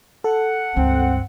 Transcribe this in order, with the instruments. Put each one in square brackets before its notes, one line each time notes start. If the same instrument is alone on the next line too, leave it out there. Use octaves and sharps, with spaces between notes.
[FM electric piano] A4 [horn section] F#5
[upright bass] C#2 G2 [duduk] C4